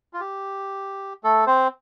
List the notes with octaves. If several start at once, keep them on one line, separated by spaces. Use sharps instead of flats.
F4
G4
A3 A4
C4 C5